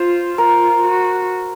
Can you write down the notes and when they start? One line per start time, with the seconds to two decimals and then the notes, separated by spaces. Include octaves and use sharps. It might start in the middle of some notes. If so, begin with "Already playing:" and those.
Already playing: F4 C5
0.37 F4 A#4
0.85 F#4